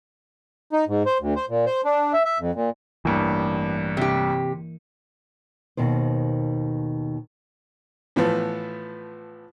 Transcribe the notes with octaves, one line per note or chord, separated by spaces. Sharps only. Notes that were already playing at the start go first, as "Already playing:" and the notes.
D#4
G#2
C5
D2
C5
A#2
C5
D4
E5
E5
F2
A#2
A1 G2 E3 A#3
C3 G4
D#2 B2 D#3 C5
A2 E3 F3 B3